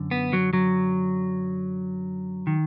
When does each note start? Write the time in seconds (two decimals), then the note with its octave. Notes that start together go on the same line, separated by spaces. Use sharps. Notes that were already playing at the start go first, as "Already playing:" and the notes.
Already playing: F#2 D3
0.11 B3
0.33 F#3
0.53 F#3
2.47 D#3